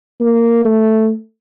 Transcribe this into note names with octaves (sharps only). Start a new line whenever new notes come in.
A#3
A3